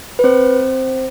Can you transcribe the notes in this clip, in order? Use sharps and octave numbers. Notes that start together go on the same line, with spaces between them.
B4
C4 C5